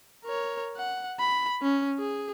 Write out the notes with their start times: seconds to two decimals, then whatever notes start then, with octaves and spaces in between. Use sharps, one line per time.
0.25 A#4 C#5
0.77 F#5
1.20 B5
1.62 C#4
1.99 G#4